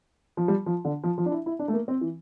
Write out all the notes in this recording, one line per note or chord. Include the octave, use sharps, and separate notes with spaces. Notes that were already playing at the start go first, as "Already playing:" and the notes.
F3
G3
F3
D3
F3
F3
D4
E4
E4
D4
A3
A#3
C4
E3